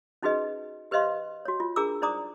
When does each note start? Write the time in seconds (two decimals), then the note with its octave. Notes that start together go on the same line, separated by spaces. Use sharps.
0.23 C#4 D#4 F#4 G#4 B4 D#5
0.91 G4 B4 C5 D#5 F5 C6
1.45 F#4 C#5
1.60 F4
1.76 D4 G#4 A#4 A#5 D6 E6
2.02 D#4 C5 D5 A#5 D6 D#6